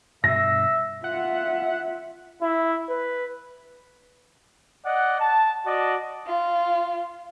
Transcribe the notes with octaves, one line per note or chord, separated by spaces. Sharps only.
G2 B2 E5 A#6
F4 E5 F#5
E4
B4
D5 D#5 F#5
A5
F#4 D5 D#5 A5
F4